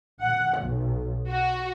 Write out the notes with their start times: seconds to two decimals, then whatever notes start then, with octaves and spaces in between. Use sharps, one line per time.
0.22 F#5
0.60 B1
1.28 F#4